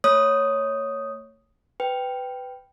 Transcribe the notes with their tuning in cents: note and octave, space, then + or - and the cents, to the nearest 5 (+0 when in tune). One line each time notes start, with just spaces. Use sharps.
A3 +40 C#5 +0 D#6 +0
B4 +15 G5 -5